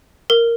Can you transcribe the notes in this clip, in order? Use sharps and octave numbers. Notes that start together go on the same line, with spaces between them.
A#4